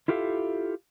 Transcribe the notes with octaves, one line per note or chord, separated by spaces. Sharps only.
E4 F4 G4 A4 E5 F5